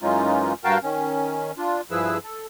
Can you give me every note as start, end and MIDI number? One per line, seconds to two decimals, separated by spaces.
0.02 0.53 42
0.02 0.53 52
0.02 0.53 56
0.02 0.53 61
0.02 0.53 63
0.02 0.53 65
0.64 0.78 43
0.64 0.78 66
0.64 0.78 70
0.64 0.78 77
0.64 0.78 79
0.64 0.78 81
0.83 1.52 51
0.83 1.52 61
1.57 1.81 62
1.57 1.81 65
1.91 2.18 43
1.91 2.18 53
1.91 2.18 64
1.91 2.18 68
1.91 2.18 71
1.91 2.18 88
2.24 2.46 69